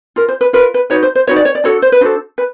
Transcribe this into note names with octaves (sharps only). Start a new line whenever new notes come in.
F4 A#4
C5
B4
F4 A#4 B4
B4
D#4 F#4 B4 C#5
C5
C5
D#4 F#4 B4 C#5
D5
C#5
D5
D4 F#4 A4 C#5
C5
B4
D4 F#4 A4 C5
B4